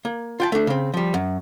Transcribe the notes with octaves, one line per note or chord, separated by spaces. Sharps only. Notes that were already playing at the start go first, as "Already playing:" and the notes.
A#3
F4 G5 A5
A3 D4
C#3 C4
F3 G3
F#2